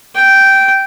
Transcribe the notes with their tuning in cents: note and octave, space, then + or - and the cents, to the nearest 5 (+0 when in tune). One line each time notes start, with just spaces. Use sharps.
G5 -10